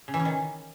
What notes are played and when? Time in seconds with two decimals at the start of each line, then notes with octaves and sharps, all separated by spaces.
0.08 C#3
0.14 E3
0.20 C#4
0.25 D#3